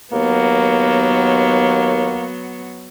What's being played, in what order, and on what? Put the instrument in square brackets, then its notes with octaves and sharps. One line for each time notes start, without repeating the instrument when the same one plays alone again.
[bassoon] D#2 [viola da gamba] F#3 B3 [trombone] A#3